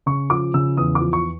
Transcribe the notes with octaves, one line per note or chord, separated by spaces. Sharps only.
C#3 C#6
F3 D6
C#3 E6
E2 D#6
D6
F3
C#6